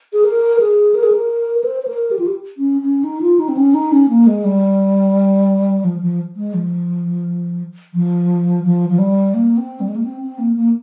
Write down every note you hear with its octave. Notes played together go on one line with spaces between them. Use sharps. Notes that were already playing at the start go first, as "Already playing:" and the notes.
G#4
A#4
G#4
A#4
G#4
A#4
A#4
C5
C5
A#4
G4
F4
G4
C#4
C#4
D#4
F4
D#4
C4
C#4
D#4
C#4
A#3
G#3
G3
F3
F3
G#3
F3
F3
F3
F3
G3
A#3
C4
G3
G#3
A#3
C4
C4
A#3
A#3